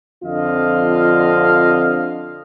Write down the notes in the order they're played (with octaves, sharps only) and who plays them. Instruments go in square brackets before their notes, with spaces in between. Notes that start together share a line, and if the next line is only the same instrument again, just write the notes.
[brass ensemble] F2 D3 C4 F4 D#5 F5